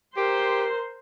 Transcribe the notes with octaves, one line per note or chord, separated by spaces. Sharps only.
G4 A#4 C5 C6